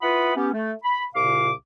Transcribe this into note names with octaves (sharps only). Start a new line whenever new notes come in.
E4 F4 B4 F#5 B5 D#6
B3 C#4 G4
A3
B5
C2 A#2 C#3 F5 D6